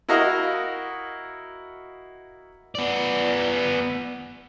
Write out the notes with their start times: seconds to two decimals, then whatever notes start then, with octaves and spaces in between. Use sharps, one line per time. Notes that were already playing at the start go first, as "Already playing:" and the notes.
0.09 E4 F#4 A#4 D#5 F5 A#5
2.75 B3 D5